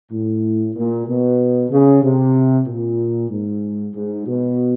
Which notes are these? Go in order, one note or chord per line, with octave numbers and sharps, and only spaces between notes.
A2
A#2
B2
C#3
C3
A#2
G#2
G#2
B2